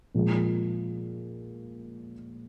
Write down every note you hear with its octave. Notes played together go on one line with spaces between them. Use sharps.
A#2 F3 G#3